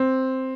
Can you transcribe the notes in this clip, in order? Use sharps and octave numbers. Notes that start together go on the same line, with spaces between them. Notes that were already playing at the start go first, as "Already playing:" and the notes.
Already playing: C4